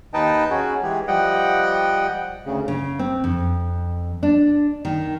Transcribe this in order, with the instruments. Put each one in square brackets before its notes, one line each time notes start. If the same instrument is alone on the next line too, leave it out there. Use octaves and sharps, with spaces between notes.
[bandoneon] D#2 D#4 B4 D#5 G5 A5
C#4 F#4 G#4
E3 G#3 G4 G#4
F3 G3 D#5 F#5 G5
D2 C#3
[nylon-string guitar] C#3
C4
F2
D4
D#3